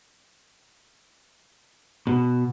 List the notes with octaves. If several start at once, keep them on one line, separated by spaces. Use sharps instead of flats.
B2